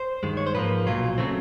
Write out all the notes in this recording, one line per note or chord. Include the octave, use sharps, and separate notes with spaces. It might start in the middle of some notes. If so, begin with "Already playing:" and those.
Already playing: C5
G2 D#3 G#3
C#5
C5
G#2 F3 A#3 B4
B1 A#2 F#3 F4
C#3 F#3 A3 C4